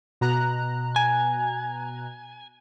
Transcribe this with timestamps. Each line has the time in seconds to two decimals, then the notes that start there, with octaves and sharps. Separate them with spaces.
0.21 B2 A#5 F#6
0.96 G#5